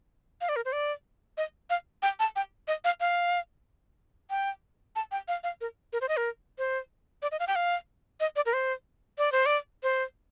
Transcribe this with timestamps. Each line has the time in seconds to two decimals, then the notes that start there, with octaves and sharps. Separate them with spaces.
0.41 F5
0.49 D5
0.56 A#4
0.65 C5
0.72 D5
1.37 D#5
1.70 F5
2.03 G5
2.20 A5
2.36 G5
2.68 D#5
2.84 F5
3.00 F5
4.30 G5
4.96 A5
5.12 G5
5.28 F5
5.44 F5
5.61 A#4
5.93 A#4
6.01 C5
6.09 D#5
6.17 A#4
6.58 C5
7.22 D5
7.32 D#5
7.40 F5
7.48 G5
7.56 F5
8.20 D#5
8.36 D5
8.46 A#4
8.53 C5
9.18 D5
9.32 C5
9.46 D5
9.83 C5